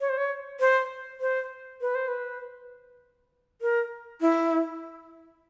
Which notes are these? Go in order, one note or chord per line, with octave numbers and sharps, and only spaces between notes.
C#5
C5
C#5
C5
C5
B4
C5
B4
A#4
E4